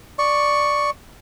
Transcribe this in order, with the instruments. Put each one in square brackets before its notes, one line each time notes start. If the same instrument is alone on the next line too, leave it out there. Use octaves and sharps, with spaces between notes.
[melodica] D5 C#6